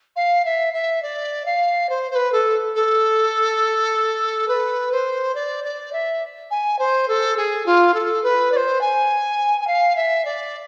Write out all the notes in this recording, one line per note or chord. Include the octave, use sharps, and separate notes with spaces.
F5
E5
E5
D5
F5
C5
C5
B4
A4
A4
B4
C5
D5
D5
E5
G#5
C5
A4
G#4
F4
A4
B4
D5
C5
G#5
G#5
F5
E5
D5